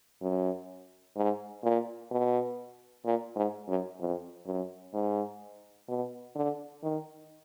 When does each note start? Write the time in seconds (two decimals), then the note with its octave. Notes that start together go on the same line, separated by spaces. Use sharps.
0.22 F#2
1.16 G#2
1.63 A#2
2.11 B2
3.05 A#2
3.36 G#2
3.68 F#2
3.99 F2
4.46 F#2
4.94 G#2
5.88 B2
6.36 D3
6.83 D#3